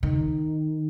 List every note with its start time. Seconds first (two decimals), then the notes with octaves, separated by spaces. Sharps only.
0.03 D#3